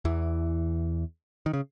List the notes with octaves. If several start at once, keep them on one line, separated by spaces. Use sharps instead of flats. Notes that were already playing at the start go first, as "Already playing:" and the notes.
E2 E3
D#3
C#3